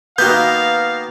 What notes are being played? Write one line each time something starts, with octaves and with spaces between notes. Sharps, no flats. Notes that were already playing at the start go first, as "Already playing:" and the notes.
D#3 A#3 B3 F#4 B4 F5 G6